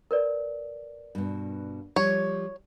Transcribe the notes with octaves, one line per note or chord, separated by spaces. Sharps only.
A#4 B4 D5
G2 B2
F3 G3 C#5